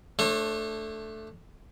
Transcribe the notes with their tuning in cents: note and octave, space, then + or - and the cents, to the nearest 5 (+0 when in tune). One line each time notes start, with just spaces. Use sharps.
A3 +0 D4 +5 C#5 -45